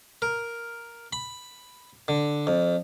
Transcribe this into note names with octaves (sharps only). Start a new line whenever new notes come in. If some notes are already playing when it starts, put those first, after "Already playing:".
A#4
B5
D3
F2